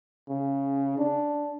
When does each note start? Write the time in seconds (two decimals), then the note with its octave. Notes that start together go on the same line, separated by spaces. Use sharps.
0.28 C#3
0.98 D4